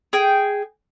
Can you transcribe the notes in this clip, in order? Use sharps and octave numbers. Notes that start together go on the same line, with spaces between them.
G#4 G5